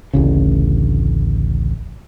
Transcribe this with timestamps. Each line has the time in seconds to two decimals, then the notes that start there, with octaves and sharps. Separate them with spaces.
0.13 D1 A1 C#3